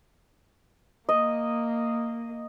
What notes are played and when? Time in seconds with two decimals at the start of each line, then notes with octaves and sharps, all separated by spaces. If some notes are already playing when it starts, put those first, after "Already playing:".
1.09 A#3 D#5